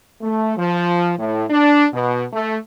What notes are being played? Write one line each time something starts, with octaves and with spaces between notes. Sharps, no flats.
A3
F3
A2
D4
B2
A3